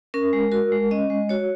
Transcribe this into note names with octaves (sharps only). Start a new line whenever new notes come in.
C#4 A#4
G#3
F#4 A#4
G#3
C#4 D#5
G#3
F#4 C#5